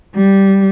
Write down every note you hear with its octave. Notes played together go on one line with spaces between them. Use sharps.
G3